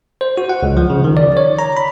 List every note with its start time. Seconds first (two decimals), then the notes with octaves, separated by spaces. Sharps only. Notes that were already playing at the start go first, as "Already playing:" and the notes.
0.21 C5
0.37 F#4
0.49 F#5
0.63 C#2
0.77 F3
0.90 C#3
1.04 D#3
1.17 D5
1.37 C#5
1.59 A#5
1.77 B5